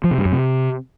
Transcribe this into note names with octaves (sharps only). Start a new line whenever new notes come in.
F3
C3
G2
F#2
C3